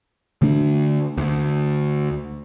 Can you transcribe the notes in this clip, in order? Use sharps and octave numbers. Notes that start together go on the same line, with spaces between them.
D3 A3 D4
D2